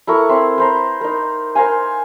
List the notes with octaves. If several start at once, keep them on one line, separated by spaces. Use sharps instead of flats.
E4 A4 A#4 C#6
C4 E5 C6
B4 C5 A#5
D#4 A#4
A#4 C5 F5 G#5